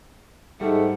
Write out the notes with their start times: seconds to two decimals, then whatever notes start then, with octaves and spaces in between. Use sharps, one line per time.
0.61 G#2 G3 A3 F#5